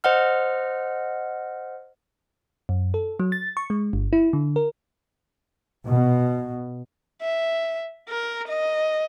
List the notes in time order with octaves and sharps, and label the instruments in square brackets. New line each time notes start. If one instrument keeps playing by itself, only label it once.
[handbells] C5 D#5 F#5 F6
[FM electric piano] F#2
A4
F#3
A6
C#6
G#3
G1
E4
D3
A#4
[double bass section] B2
[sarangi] E5
A#4
D#5